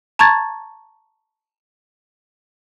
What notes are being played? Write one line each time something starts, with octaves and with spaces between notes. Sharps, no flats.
A5 A#5 C#6 G#6 A6